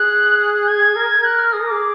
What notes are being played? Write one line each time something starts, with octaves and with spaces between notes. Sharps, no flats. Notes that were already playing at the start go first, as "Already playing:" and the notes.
Already playing: G#4 F#6
F#6
F#6
G#6
A#4
A#4 F#6
F6
G#4 D#6
A#4
G#4 D6